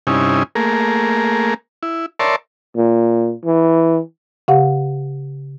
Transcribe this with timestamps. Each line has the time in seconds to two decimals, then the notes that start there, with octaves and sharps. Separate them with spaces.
0.07 G2 C3 C#4 D#4 E4 G#5
0.55 A3 A#3 G#4 A#4
1.83 E4
2.20 A#4 C#5 D5 E5 A5 C6
2.76 A#2
3.45 E3
4.48 C#3 G4 F5 F#5